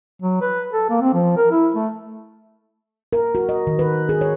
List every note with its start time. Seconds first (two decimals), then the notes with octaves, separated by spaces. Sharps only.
0.22 F#3
0.41 B4
0.73 A4
0.90 A#3
1.01 C4
1.14 F3
1.37 A#4
1.51 E4
1.75 A3
3.13 A#4
3.35 F#4
3.49 D#5
3.67 D#3
3.79 B4
4.09 G#4
4.21 C#5